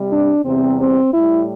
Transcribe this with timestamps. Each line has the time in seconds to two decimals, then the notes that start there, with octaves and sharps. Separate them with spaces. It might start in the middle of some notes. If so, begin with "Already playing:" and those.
Already playing: C3 G3
0.11 D4
0.45 E2 C3 G3 C4
0.79 C4
1.12 A2 G3 E4